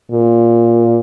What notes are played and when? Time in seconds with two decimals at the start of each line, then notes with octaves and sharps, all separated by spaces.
0.11 A#2